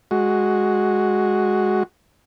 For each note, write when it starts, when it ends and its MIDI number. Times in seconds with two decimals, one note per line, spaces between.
0.11 1.83 56
0.11 1.83 66